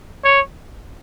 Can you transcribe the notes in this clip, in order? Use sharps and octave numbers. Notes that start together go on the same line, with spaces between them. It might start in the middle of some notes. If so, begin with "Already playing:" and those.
C#5